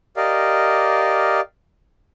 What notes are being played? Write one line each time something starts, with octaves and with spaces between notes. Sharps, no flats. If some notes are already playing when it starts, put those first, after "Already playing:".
G4 A#4 D5 D#5 F5